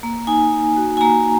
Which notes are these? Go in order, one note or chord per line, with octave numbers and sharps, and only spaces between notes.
A#3
D#4 G#5
A#3
F#4
G#5
A#3 A#5